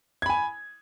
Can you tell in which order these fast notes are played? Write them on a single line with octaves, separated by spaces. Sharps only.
G#6 B5 G#5